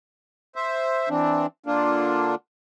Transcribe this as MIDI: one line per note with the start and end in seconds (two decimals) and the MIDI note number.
0.56 1.09 72
0.56 1.09 76
1.09 1.46 52
1.09 1.46 60
1.09 1.46 62
1.66 2.35 50
1.66 2.35 58
1.66 2.35 62
1.66 2.35 65